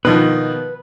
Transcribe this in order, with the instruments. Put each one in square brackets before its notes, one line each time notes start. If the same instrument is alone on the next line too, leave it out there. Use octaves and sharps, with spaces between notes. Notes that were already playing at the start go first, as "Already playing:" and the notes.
[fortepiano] B2 D#3 F3 [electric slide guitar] B4